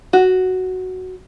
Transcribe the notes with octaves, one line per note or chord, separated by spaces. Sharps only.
F#4